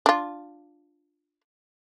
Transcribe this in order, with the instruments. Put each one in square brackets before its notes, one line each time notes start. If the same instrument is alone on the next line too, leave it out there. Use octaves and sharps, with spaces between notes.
[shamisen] D4 F4